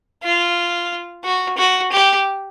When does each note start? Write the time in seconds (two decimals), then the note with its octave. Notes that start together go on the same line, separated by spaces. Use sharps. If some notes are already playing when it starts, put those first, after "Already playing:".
0.23 F4
1.24 F#4
1.57 F#4
1.92 G4